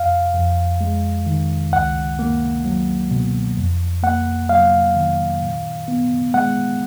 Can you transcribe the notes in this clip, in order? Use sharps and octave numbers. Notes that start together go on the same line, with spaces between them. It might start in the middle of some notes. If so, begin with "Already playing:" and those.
Already playing: F2 F5
F2
G#3
D#3
C#2 F#5
A#3
F#3
B2
F2
A#3 F#5
F#3 F5
D#3
A#2
B3
G#3 F#5